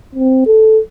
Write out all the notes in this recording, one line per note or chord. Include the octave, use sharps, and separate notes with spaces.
C4
A4